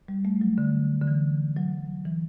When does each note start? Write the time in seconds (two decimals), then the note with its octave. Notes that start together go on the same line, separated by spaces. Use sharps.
0.08 G3
0.25 A3
0.41 F#3
0.58 D3
1.01 D3
1.07 E3
1.56 F#3
2.05 E3